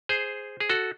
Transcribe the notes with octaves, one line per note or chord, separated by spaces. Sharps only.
G#4 C5
G#4
F#4 A4